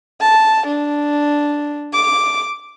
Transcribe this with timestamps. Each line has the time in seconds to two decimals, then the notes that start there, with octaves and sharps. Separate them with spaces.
0.21 A5
0.67 D4
1.94 D6